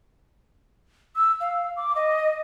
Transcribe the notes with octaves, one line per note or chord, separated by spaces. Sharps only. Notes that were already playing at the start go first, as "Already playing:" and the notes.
E6
F5
D6
D#5